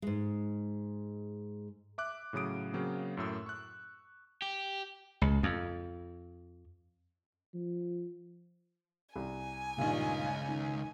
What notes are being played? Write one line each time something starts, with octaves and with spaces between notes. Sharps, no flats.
G#2 G#3
E5 D6 F#6
A2 C#3 F#3 D#6 D7
C#3 F#3 A#3 C4
F#2 A2 E6
C#6 F#6
G4
C#2
F2
F3
C2 G#5
C#2 G2 A#2 D#3 D#5
D#3